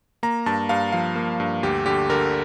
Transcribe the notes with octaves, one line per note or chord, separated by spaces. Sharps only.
A#3 A#5
G2 A5
G2 F5
F3 F5
A#3
G2
D2 G4
D3 G4
D3 A#4